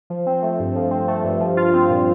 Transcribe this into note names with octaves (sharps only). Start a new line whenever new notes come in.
F3
C4
A3
G2
F3
C4
A3
G2
F3
F4
C4
A#2